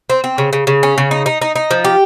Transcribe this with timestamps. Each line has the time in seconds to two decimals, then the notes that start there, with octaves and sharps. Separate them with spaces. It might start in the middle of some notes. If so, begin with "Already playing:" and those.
0.10 C4
0.24 C4
0.38 C#3
0.53 C#3
0.67 C#3
0.83 C#4
0.98 C#3
1.11 D#4
1.26 D#4
1.42 D#4
1.56 D#4
1.71 F3
1.85 G4